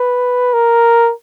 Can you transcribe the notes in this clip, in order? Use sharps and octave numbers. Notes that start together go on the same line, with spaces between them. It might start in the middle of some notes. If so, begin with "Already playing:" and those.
Already playing: B4
A#4